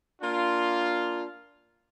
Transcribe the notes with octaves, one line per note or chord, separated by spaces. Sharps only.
A#3 D4 F4